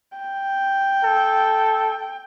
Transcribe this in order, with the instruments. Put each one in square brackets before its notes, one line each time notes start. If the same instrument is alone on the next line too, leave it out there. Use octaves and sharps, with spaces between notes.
[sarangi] G5
[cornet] A4